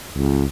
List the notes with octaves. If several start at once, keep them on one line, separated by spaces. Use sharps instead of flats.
C#2